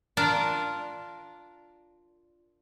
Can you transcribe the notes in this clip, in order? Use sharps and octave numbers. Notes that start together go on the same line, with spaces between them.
D4 F4 A#4 D5